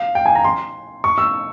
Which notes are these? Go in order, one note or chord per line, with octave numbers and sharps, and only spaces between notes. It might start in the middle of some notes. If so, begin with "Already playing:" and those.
Already playing: F5
G5
G#5
A#5
C6
C#6
E6